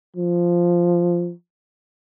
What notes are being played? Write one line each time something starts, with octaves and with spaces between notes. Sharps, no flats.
F3